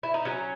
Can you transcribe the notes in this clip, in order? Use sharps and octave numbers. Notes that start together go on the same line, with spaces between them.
E4
D#4
F#3 C#4